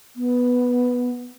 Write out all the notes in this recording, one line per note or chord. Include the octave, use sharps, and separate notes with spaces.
B3